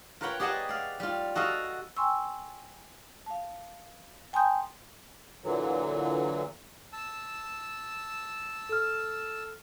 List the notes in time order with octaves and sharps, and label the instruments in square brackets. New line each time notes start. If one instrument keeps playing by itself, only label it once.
[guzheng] F4 A#4 B4 C#5 F#5 G5
G4 G#4 D5 D#5 F#5 A5
D5 F5
G3 F4
F#4 A4 D#5 F5
[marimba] G5 G#5 C6 C#6 E6
F5 A5
G5 G#5 A#5 C6 D#6 G6
[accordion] A#2 D3 E3 F#3
[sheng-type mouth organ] A5 E6
[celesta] A4 F6